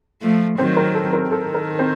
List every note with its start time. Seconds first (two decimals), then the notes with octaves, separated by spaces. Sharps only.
0.22 F3 A3
0.58 D#3 F#3 C4 C5
0.77 A#4
0.95 A4
1.13 A#4
1.30 D#3 A4
1.54 A#4
1.79 C4 C5